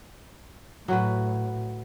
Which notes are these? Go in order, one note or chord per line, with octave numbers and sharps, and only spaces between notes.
A2 F#3 F#4 B4